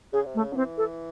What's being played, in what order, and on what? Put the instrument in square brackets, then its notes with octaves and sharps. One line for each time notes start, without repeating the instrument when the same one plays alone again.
[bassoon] C#3 [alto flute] G#4
[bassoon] C3
[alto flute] A3
[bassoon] C#3
[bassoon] F#3 [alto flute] C#4
[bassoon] E3 [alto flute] C4
[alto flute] A4